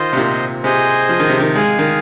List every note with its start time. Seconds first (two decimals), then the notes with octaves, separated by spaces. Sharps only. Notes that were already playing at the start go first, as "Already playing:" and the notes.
Already playing: D#3 F4 C5 D#5
0.13 C3
0.17 A#2
0.64 C3 G#4 C5 D#5 G#5
1.09 F3
1.20 D#3
1.29 C3
1.40 D#3
1.55 G#3 G#4 F5 G#5
1.79 D#3